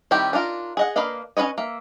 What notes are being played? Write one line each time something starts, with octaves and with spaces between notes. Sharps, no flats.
D#3 G3 C4 E4 G4
D4 D#4 F4 A#4
G#4 D#5 F#5
A#3 D4 B4 D#5 F5
C#4 F4 B4 C#5 D#5
A#3 E5